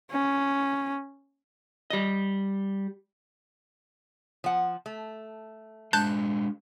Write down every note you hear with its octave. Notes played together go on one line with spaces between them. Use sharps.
C#4
G3 D#5
F3 F#5
A3
G#3 D4 C5 A5 F#6 G6